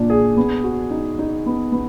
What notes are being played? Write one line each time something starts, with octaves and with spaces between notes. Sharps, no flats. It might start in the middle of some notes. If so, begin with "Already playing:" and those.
Already playing: A#2 D4
G#4
B3
F#4
D#4
D#4
B3
B3